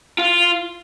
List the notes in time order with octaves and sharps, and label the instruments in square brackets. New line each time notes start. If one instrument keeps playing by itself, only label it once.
[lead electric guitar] F4